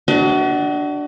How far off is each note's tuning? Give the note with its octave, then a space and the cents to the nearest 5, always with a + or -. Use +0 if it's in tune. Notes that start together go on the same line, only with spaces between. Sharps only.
D4 +0 F#4 +25 D#5 +45